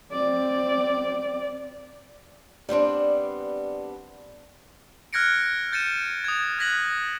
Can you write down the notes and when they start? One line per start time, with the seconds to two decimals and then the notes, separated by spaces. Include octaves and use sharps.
0.12 C4 D5
2.69 G3 B3 C4 D4
5.13 F6 F#6 G#6 A#6 C#7 D7
5.72 G6 A6 C#7 D#7 E7
6.24 D#6 G#6
6.59 F#6 G#6 A#6 B6 F#7